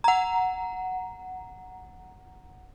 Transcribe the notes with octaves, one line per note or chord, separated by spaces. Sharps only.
F#5 A#5